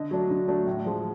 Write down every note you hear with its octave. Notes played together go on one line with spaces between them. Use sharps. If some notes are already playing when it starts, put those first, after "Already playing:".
Already playing: D3 D#5
F#3 A3 D4
D3
F#3 A3 D4
A2
F3 G#3